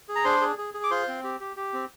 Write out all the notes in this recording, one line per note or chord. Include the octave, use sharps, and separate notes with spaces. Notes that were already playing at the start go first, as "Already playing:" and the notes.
G#4
A#5
D4 C5 C6
G#4
G#4
G#4
D6
F4 C5 C6
C4
G4
G4
G4
C4